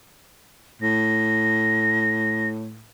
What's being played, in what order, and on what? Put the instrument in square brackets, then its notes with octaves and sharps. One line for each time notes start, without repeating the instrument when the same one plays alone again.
[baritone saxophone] A2 [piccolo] A#6